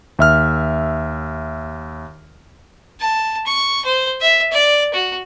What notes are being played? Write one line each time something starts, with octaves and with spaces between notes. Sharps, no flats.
D#2 E5 F6
A5
C#6
C5
E5
D5
F#4